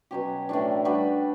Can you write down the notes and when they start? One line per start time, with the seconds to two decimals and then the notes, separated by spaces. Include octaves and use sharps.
0.11 B2 F#3 C#4 G4
0.49 A2 E3 A3 D4
0.85 G3 D4 F#4 B4